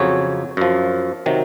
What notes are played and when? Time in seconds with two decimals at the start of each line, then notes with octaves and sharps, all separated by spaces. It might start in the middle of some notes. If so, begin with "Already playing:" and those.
Already playing: F2 C#3 F#3 C#5
0.57 F#2 F3
1.26 C3 D#3 F#3